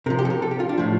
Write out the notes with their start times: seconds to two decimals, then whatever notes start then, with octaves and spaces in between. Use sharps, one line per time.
0.06 C3 A#4
0.10 F3
0.19 G4
0.25 A4
0.30 A#4
0.42 A4
0.51 G4
0.60 F4
0.69 D4
0.78 A2 F3